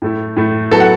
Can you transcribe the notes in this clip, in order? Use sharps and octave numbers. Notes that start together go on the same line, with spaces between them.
A2 A3 E4
A2 A3 E4
F#3 B3 E4 A4 A5
F#5